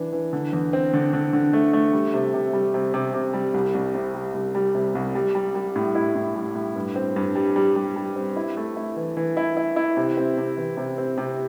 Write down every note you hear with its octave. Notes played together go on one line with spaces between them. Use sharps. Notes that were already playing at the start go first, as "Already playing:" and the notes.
Already playing: E3 D4
E3
D3
E2
C4
D3
D3
D3
A3
A3
G3
C3
C3
G3
C3
C3
C3
G3
C2
C2
C3
G3
C2
G3
C3
C2
G3
G3
G3
A2
E4
A2
G3
A2
G2
C4
G2
G3
G3
G3
G3
C4
E4
A3
E4
E3
E3
E4
E4
E4
C3
C4
C3
E3
C3
C4
C3